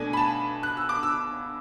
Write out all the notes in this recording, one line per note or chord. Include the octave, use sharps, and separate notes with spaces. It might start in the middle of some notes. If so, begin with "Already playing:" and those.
Already playing: B2 A3 D4 G#5
B5
A5
F#6
E6
D6
E6